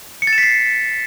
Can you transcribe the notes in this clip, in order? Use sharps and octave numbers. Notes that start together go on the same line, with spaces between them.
C#7
A6
E7
B6
C7